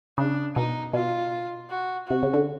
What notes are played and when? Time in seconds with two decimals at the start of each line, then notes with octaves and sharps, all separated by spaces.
0.18 C#3 D4
0.56 B2 D#4
0.93 B2 F4
1.70 F#4
2.07 C3 F#4
2.23 C#3
2.33 D3